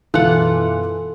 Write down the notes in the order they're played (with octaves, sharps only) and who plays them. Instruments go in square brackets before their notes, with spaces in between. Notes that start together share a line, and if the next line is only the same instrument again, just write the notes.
[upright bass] F#2 B2 [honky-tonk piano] E3 F#6 [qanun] F4 F#5 [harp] A4